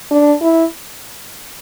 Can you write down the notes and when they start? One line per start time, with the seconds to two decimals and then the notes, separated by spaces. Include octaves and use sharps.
0.11 D4
0.42 E4